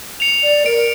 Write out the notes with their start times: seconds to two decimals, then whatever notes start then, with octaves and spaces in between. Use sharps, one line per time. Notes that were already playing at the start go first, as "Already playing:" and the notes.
0.20 C#7 F7
0.43 D5
0.66 A#4 D7